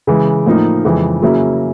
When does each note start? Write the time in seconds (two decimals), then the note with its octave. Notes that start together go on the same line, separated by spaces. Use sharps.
0.07 C#3 E3 G#3
0.46 A2 F3 A#3 D#4
0.84 F2 C#3 E3 G#3
1.22 C#3 F#3 A#3 C#4 E4